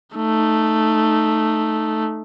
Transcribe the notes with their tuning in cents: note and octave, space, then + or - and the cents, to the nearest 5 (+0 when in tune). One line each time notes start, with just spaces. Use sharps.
A3 +0 D#4 -10